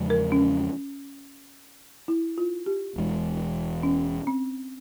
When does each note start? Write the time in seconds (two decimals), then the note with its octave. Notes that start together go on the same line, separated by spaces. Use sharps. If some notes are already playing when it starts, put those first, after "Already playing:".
Already playing: E2 C#3 F3 G#3
0.10 A#4
0.32 C#4
2.08 E4
2.38 F4
2.66 G4
2.96 E1 E2 E3 G#3
3.83 C#4
4.27 C4